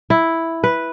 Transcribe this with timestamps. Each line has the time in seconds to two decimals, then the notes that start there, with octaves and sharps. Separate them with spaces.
0.10 E4
0.64 B4